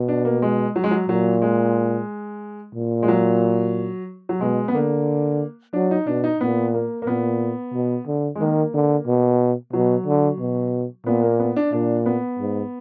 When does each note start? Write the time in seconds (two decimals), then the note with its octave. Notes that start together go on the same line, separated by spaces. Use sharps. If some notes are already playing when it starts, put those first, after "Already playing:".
Already playing: B2
0.08 D4
0.25 A#3
0.42 G#3
0.76 F#3
0.84 G#3
0.91 F#3
1.09 A#2 F#3
1.42 G#3
2.75 A#2
3.03 G#3
3.08 F#3
4.29 F#3
4.41 B2 G#3
4.68 B3
4.74 D3 A#3
5.73 F#3 D4
5.91 D#4
6.07 B2 D4
6.24 D#4
6.40 A#2 B3
6.74 A#3
7.02 A#3
7.07 A#2 B3
7.74 B2
8.07 D3
8.35 G#3
8.40 D#3 A#3
8.74 D3
9.06 B2
9.73 B2 F#3
10.06 D3
10.39 B2
11.06 A#2 B3
11.23 A#3
11.40 B3
11.56 D4
11.72 A#2 D4
12.06 B3
12.39 G#2